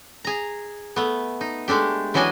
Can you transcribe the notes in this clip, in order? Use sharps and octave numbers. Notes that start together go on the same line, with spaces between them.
G#4 A#5
A3 B3
D#4
G#3 A3 D4 G4
E3 F#3 D4 C#5 D#5 G#5